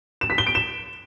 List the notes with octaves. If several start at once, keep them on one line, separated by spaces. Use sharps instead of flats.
E7
B6
G7
D7
E7